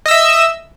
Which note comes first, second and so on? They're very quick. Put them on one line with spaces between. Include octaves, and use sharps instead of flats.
D#5 E6 E5